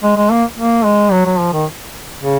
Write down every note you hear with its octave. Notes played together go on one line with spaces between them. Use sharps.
G#3
G#3
A#3
A#3
G#3
F#3
F#3
F3
D#3
C#3